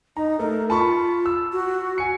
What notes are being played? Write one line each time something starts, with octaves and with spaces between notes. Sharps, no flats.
D#4 A#5
A3 A#4
F4 A5 B5 C#6
E6
F#4
G#5 C#7